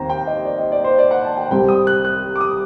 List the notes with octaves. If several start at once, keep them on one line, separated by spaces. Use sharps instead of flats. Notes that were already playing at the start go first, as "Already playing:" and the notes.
Already playing: D#2 D#3 G3 C4 C5 A#5
G5
D#5
D5
D#5
D5
C5
D5
F#5
A5
G5
C2 C3 G3 C4 G5
D#6
F#6
F#6
D6
D#6